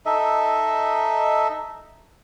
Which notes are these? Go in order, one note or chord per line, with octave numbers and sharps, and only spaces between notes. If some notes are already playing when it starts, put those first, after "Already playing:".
D#4 A4 D#5 E5